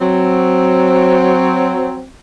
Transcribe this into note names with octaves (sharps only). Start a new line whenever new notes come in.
F#3 C4